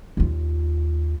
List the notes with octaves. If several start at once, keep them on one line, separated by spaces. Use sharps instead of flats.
D#2 F4